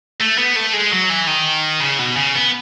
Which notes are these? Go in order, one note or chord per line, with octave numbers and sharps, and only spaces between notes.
A3
B3
A3
G#3
F#3
E3
D#3
C#3
B2
C#3
B3